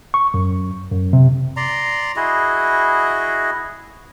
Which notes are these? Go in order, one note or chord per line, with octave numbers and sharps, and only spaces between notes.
C#6
F#2
F#2
C3
D5 A#5 C6
E4 F#4 G#4 D#5